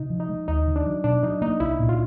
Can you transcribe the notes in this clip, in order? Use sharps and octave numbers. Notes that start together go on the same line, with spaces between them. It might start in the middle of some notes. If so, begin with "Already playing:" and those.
Already playing: C3 D#4
F3
D#4
G#3
D#2 D#4
D#3
D4
F#3
B2 D4
F#3 D#4
A#3 D#4
C2 E4
A#2
F4